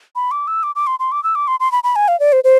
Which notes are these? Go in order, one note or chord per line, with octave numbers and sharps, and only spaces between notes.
B5
D6
E6
D6
D6
C6
C6
D6
E6
D6
C6
C6
B5
B5
G#5
F5
D5
C5
C5